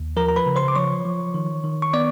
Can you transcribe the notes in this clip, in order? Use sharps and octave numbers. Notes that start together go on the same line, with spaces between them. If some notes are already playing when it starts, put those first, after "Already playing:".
Already playing: D#2
F3 A#4 A#5
A#5
B4 B5
C#3
C5 C6
D6
F3 C#5 C#6
F3
D#3
D#3
C#6
B3 D5 D6